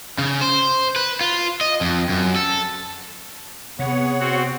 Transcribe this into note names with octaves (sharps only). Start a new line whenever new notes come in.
C#3
C5
B4
F4
D#5
F2
F#2
A4
C3 B3 G#4 C#5 F#5
C4 F#4